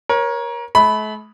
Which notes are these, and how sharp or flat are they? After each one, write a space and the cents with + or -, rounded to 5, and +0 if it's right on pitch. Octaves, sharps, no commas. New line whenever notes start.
A#4 +25 C#5 -10
A3 -40 B5 +0